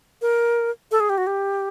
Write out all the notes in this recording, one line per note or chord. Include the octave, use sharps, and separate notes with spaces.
A#4
A4
G#4
G4
F#4
G4